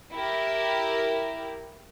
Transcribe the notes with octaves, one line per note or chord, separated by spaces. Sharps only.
E4 G4 A#4